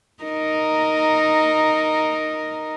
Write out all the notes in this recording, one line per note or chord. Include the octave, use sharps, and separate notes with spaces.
D#4 A#4